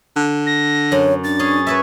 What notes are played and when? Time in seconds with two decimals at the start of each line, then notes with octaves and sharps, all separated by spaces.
0.16 D3
0.46 A#6
0.92 F#2 C#5
1.24 D4 A6
1.39 C#4 G#4
1.67 B4 C#5 E5